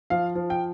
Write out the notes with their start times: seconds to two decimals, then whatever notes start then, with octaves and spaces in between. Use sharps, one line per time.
0.10 F3 F5
0.35 F3
0.50 G5